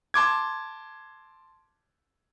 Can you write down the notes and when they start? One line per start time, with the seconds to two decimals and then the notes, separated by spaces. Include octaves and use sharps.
0.14 A5 C6 D6 G#6